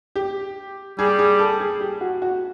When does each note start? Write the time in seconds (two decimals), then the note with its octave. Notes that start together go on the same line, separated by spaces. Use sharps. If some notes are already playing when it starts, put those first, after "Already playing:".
0.16 G4
0.98 G3 G#4
1.19 G#4
1.39 A4
1.60 G#4
1.81 G4
2.01 F#4
2.22 F#4